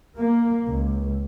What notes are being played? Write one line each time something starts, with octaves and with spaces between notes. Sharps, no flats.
A#3
C#2